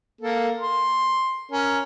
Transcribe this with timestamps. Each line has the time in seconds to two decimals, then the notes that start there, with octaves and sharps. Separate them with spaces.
0.21 A#3 A4
0.60 C6
1.52 C#4 A#4